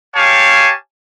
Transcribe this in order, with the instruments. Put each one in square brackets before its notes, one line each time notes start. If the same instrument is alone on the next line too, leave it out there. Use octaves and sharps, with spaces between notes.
[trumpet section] G4 C#5 F5 G#5 A5